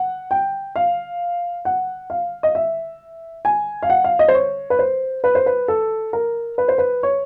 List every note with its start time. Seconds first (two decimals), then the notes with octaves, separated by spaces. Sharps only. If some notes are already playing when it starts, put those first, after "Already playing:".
Already playing: F#5
0.31 G5
0.76 F5
1.65 F#5
2.10 F5
2.43 D#5
2.55 E5
3.45 G#5
3.83 F5
3.90 F#5
4.04 F5
4.19 D#5
4.28 C5
4.35 C#5
4.70 B4
4.79 C5
5.24 B4
5.35 C5
5.46 B4
5.68 A4
6.13 A#4
6.58 B4
6.68 C5
6.78 B4
7.03 C#5